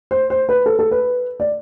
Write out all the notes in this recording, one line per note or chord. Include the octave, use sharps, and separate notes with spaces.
C5
C5
B4
A4
A4
B4
D5